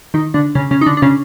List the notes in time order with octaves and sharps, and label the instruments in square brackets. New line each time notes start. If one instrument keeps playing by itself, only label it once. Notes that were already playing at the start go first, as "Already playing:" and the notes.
[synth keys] D#3 D#4
D3 D4
C#3 C#4
C#3 C#4
D#4
D3 D4
D4
C#3 C#4